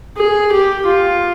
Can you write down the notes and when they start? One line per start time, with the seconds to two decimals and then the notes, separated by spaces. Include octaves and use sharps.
0.17 G#4
0.52 G4
0.86 F4